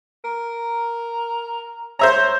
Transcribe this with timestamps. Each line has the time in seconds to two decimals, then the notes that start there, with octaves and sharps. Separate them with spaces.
0.24 A#4
1.99 C5 C#5 E5 A#5